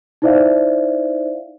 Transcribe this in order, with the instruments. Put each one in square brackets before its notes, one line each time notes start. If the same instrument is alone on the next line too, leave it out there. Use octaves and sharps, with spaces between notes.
[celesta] D#4 E4 C5 D5 E5 F5